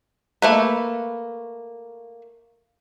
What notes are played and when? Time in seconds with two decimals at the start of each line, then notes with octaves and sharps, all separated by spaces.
0.42 A3 A#3 B4